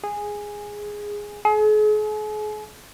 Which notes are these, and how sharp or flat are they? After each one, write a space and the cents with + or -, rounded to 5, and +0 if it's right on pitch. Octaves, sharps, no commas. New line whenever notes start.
G#4 -5
G#4 +40